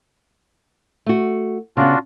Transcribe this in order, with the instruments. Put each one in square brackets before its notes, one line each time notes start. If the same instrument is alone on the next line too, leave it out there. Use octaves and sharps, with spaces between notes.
[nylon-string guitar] A3 F#4
[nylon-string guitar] C#3 B3 [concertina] D4 F4 F#4